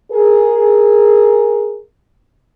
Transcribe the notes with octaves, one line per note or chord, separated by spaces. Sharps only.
G#4 A#4